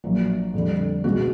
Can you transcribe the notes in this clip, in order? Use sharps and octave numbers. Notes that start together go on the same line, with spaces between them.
A#1 A#2 F#3
F2 D3 G3
C#2 B2 G#3 F#4